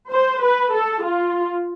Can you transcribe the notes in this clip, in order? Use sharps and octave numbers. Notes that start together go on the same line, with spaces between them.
C5
B4
A4
F4